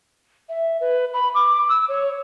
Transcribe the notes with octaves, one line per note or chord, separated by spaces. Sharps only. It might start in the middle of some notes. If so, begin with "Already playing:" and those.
E5
B4
B5
D6
E6
C#5